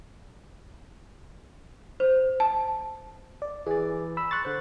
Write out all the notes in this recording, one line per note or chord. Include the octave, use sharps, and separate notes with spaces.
C5
A5
D5
E3 G#4 D5
B5 E6
C6 C#6 F#6 A6
D3 C5